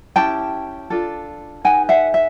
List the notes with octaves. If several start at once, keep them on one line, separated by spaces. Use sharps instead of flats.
C#4 E4 G4 G5 A5
D4 F4 A4
D#4 G#4 B4 F#5 G#5
E5 F#5
E5